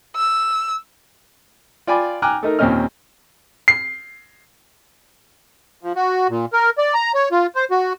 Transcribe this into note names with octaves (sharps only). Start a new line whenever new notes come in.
E6
F4 D5 G5 G#5 B5 D6
G5 G#5 A#5 D6 F6 F#6
A3 D#4 A#4
D#2 A#2 C4 C#4 D#5 F6
C7
F3
F#4
A#2
A#4
D5
A#5
C#5
F4
C5
F#4